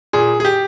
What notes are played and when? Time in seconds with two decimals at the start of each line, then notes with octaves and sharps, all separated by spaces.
0.13 A#2 G#4
0.40 G#4
0.45 G4